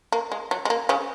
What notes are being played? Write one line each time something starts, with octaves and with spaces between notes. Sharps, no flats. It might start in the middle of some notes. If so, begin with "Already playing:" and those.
A#3
G#3
F#3
G#3
A#3
C#3 C#4